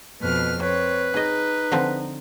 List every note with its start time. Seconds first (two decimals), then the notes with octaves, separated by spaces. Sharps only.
0.22 F2 B2 B4 F6
0.62 C4 B4 C#5
1.14 D#4 G#4 D#5
1.72 D3 F3 C4